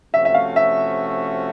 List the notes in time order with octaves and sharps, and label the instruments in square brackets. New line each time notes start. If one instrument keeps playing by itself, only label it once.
[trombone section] C3 F3 A3 C#4 F#4 [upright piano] E5
[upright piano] E5
F5
E5